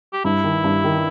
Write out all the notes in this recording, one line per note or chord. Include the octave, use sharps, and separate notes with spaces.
G4
G2 E4
D#3
G2
D#3